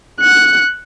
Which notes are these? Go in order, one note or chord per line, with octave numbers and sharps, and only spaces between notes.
F#6 C#7